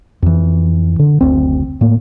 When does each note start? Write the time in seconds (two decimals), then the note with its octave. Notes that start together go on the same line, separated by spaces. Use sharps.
0.22 F2 E3
0.99 D3
1.21 F#1 D2 C4
1.81 A2 A#3